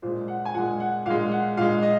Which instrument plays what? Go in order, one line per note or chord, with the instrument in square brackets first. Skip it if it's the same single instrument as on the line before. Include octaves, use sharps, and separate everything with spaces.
[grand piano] A#2 G#3 C5
F#5
G#5
A#2 G#3 F#5
F#5
A#2 G#3 F5
F#5
A#2 G#3 F5
D#5